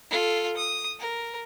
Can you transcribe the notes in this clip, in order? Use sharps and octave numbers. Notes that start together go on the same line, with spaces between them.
F4 A4
D#6
A#4